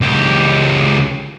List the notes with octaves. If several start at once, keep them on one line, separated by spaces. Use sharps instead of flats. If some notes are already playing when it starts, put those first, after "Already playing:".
C#2 G4